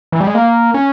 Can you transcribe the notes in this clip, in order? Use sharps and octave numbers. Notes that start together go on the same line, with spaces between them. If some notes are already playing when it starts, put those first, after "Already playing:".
E3
G3
G#3
A#3
C#4